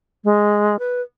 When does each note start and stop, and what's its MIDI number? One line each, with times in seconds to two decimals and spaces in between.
0.24 0.79 56
0.79 1.01 71